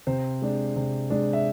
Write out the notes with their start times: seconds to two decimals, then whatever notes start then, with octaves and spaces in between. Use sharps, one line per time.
0.07 C3 C5
0.42 G#3 D4
0.76 C3
1.10 G#3 D4
1.33 E5